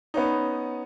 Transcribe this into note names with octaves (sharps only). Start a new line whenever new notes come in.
B3 C#4 D#4